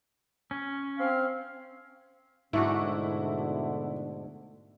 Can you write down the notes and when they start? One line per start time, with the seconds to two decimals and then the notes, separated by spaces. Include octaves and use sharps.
0.51 C#4
0.98 C4 F5
2.53 G#2 B2 D3 A3 D4 E4 F#4